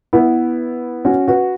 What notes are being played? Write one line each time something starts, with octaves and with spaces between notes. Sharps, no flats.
B3 E4
C#4 F#4
F#4 B4